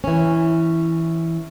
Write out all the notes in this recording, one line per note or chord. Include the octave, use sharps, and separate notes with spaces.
E3 C#4